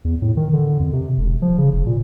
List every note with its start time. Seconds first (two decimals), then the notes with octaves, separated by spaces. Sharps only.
0.05 E2
0.22 A2
0.37 D#3
0.53 D3
0.80 F2
0.93 C3
1.18 E1
1.42 F3
1.58 C#3
1.73 F1
1.86 A#2